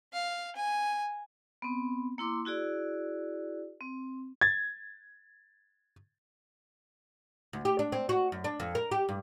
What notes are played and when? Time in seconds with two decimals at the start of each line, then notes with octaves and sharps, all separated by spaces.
0.13 F5
0.56 G#5
1.62 B3 C4
2.18 A#3 E4 C6 D6
2.45 E4 F#4 G#4 D5
3.81 C4
4.41 G#6 A6
7.53 D2
7.65 G4
7.79 D4
7.92 C4
8.09 F#4
8.32 F#2
8.44 D4
8.60 F2
8.75 A#4
8.91 G4
9.09 G2